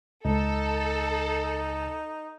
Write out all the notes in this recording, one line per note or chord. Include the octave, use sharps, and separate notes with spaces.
C#2 D#4 A4